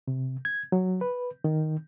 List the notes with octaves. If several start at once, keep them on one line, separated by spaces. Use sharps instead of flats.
C3
G#6
F#3
B4
D#3